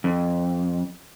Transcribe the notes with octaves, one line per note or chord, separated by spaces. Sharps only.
F2